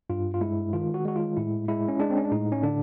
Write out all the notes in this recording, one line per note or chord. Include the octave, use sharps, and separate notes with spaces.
G2 F4
F4
G#3 E4
D#3 F4
F#4
G#3 F#4
F4
A2 E4
G#3 E4
C#4
G#3 D4
C4
C#4
D4
A2 D#4
C#4
D3 D4